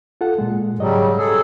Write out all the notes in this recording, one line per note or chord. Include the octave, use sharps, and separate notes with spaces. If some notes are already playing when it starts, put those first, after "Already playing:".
F4 A4 F#5
A#2 G#3
G#2 C#3 F#3 G3 D#5
G#4 A4